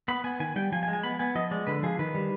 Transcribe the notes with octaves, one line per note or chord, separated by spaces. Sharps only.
B3 B5
B3 G#5
D#3 G#5
G3 G5
F3 G#5
G#5
G#3
G#5
B3 B5
B3 G#5
F3 D#5
G#3 D5
D3 B4
F3 G#4
D#3 B4
G3